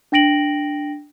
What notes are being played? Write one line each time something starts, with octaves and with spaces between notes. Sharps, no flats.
D4 G5 A#6 D7 F#7